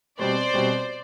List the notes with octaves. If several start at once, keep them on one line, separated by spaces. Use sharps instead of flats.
B2 G3 C4 C5 D5
B2 G3 C4